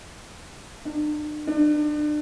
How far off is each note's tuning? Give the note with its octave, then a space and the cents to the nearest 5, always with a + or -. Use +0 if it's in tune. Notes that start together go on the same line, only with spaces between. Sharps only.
D4 +40
D4 +35